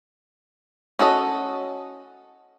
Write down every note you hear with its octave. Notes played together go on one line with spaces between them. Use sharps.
C#4 F#4 A4 D#5